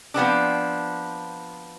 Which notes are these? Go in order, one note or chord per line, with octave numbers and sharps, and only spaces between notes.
F3 B3 C4 D4